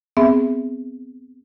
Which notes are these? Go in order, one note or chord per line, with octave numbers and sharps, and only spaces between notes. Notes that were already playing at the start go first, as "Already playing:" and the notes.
B3 C4 G#4 E5